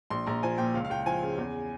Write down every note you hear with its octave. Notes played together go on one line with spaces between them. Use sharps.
A#1 C6
A#1 A#5
F3 G#5
A#2 G5
C#2 F5
F5
C#2 G5
F3 G#5
C#3
E2